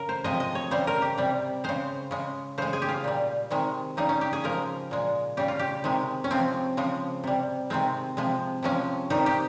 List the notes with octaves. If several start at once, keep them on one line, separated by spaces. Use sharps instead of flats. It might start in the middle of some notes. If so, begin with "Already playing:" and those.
Already playing: C#3 A#4
C5
C3 F3 G#3 D#5
D#5
C#5
C#3 G3 C5
A#4
G4
C3 G3
C#3 G#3 C5
C#3 G#3
C#3 G#3 C5
G#4
G4
F4
A#2 G3
C3 D#3 G#3
C#3 G3 D#4
C#4
G4
G#4
C#3 F3 G#3 A#4
A#2 G#3
C#3 G3 G4
F4
G4
C3 D#3 G#3
C#4
C3 F3 G#3 C4
C#3 F3 G#3
C3 G3
C3 D#3 G#3 C4
C3 F3 G#3
C3 F3 G#3 C#4
C3 D#3 G3 D#4
G4